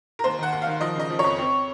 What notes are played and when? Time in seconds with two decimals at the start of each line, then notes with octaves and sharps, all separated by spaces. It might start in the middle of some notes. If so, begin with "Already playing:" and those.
0.19 A#4
0.24 D#2 C5
0.39 D#3 F#5
0.53 D#2
0.62 D#3 F5
0.81 F3 D#5
0.96 C#3 D#5
1.10 F3
1.19 F2 C#5
1.38 C4